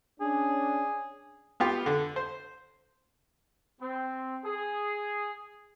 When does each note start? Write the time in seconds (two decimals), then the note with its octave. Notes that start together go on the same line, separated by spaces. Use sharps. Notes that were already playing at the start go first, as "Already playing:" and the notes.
0.20 C#4 D4 G#4
1.60 B3 F4 G4
1.86 D3
2.16 C5
3.81 C4
4.44 G#4